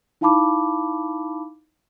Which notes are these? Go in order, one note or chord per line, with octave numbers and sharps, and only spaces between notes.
D#4 E4 F5 A5 B5 D6